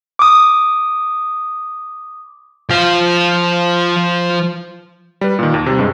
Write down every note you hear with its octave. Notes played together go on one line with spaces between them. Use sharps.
D6 D#6
F3 F5
G3 B4
A#2 D#3
D#2
C3 G3
G2 G#3